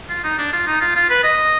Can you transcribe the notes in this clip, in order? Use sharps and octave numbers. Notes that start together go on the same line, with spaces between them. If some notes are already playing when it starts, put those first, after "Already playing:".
F4
D#4
D4
F4
D#4
F4
F4
B4
D#5